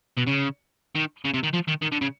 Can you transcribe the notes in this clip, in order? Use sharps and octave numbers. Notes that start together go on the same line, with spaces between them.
B2
C#3
D#3
C#3
C3
D#3
F3
D#3
D#3
D3
C#3